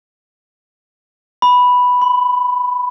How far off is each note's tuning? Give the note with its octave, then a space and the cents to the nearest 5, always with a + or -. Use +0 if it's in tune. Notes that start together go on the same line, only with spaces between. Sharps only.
B5 +0
B5 +45